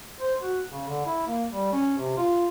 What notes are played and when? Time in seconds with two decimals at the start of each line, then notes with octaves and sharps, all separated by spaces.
0.20 C5
0.41 F#4
0.70 C#3
0.88 D3
1.05 E4
1.27 A#3
1.50 G3
1.72 C#4
1.97 C3
2.17 F4